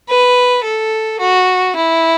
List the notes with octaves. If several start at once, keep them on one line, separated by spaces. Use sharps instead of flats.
B4
A4
F#4
E4